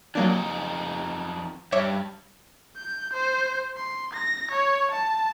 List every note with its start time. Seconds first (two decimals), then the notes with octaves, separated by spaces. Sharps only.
0.15 F2 F#3 A#3 D4 D#4
1.72 G2 C#5 E5 D6
2.76 G6
3.13 C5
3.76 C6
4.13 A#6
4.51 C#5
4.91 A5